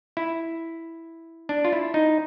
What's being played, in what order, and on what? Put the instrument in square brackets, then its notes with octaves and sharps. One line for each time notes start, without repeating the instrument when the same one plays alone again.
[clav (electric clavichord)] E4
D4
F4
E4
D#4